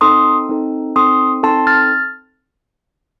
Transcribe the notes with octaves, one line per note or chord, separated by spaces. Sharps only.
C4 D#4 A4 C6 D#6
C4 D#4 A4
C4 D#4 A4 C6 D#6
C4 D#4 A4 A5 C6
F6 A6